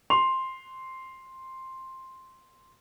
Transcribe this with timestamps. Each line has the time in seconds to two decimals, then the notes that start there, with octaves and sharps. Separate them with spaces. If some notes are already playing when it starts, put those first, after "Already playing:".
0.10 C6 F7